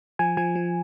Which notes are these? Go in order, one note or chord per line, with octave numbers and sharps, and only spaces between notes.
F3 G#5
F3 G#5
F3